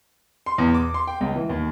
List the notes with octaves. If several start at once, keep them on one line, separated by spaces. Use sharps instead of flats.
C6
E2
D6
C6
G5
C#2
E3
D#2